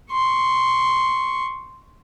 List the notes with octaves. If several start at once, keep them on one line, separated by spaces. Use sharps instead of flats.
C6 C#6